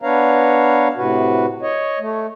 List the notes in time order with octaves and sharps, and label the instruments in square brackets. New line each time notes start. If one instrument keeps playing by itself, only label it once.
[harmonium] B3 D4 B4 C#5 F5 A#5
A2 C3 F#4 B4
C#5 D#5
A3